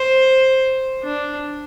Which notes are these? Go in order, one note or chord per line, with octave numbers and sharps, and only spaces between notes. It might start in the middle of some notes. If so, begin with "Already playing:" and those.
Already playing: C5
D4